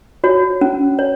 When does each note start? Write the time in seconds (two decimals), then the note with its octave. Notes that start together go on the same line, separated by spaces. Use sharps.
0.24 F#4 C#5
0.61 C#4
0.99 C#5